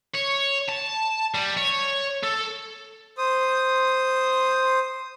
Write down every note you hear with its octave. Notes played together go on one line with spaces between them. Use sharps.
C#5
A5
G3
C#5
A4
C5 D#6